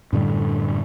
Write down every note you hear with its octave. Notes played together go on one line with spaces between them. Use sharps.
F#2 A2 D3 G3